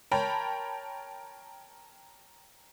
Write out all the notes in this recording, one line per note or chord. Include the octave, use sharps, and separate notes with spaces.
A#4 C#5 G5 A5 B5